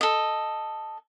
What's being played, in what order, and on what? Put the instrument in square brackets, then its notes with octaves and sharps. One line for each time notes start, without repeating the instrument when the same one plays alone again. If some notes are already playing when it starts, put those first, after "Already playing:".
[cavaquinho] A4 D#5